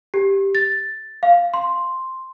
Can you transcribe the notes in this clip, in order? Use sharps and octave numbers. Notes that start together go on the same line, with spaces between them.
G4
A6
F5
C6